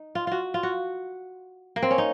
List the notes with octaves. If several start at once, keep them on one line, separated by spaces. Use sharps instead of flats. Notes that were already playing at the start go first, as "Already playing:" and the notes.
Already playing: D#4
F4
F4 F#4
F4
F#4
A#3
C4
C#4
D#4